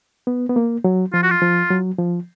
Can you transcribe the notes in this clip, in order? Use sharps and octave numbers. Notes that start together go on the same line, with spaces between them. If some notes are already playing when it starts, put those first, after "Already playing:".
B3
B3
A#3
F#3
F3 F4
F#4
F4
F3
F#3
F3